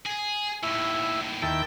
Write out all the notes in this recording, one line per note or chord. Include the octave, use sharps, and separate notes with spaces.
G#4
D#2 A2 E4
D#2 E4 G5 A5